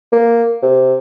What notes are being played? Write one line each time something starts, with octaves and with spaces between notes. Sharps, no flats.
A#3
C3